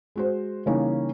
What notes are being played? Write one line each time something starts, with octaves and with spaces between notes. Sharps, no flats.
G#3 F#4 C5
C#3 E3 G3 A#3 C#4 D#4